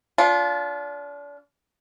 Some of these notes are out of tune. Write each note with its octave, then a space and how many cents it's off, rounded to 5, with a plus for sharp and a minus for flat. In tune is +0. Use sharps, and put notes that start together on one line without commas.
D4 -35 F4 +0